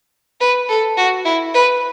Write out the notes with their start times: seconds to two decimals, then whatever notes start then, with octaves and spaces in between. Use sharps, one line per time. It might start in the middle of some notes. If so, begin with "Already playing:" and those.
0.41 B4
0.69 A4
0.97 F#4
1.25 E4
1.54 B4